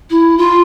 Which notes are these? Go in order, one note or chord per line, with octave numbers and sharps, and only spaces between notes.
E4
F4